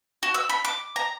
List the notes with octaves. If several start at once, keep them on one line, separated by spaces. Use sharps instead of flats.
F#4
E6
B5
D6
A#5